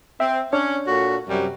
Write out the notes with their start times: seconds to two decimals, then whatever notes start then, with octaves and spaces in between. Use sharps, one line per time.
0.20 C4 E5
0.53 C#4 D4 C#5
0.87 A#2 F#4 A4
1.29 F#2 C3 G3